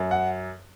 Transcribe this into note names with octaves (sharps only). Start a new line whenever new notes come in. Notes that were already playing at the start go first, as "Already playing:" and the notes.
Already playing: F#2
F#5